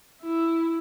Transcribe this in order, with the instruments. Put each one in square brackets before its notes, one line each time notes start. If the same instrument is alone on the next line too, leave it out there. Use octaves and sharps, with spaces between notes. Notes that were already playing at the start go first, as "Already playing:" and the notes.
[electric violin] E4